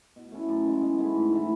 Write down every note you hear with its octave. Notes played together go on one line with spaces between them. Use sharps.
B2
A3 C#4 E4
F#2
E3 G#3
B2
A3 E4 G#4
G#2
E3 A3